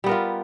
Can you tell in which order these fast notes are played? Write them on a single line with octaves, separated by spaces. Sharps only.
G3 B3 A#4 F4